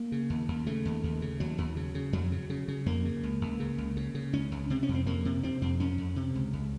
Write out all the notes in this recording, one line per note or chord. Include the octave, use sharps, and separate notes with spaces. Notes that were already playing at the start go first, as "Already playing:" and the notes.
Already playing: A#3
C#3
D#2
D#2
C#3 A3
D#2
D#2
C#3
D#2 F#3
D#2
C#3
C#3
F2 F#3
C#3
C#3
C#3
F2 A#3
C#3
C#2
C#2
C#3
C#2
C#3
C#3
C#2 C#4
C#2
C3 C4
C#4
F2
C4
F2 A#3
C3
C3 C4
F2 C4
F2 C#4
F2
C3
C#2
C#2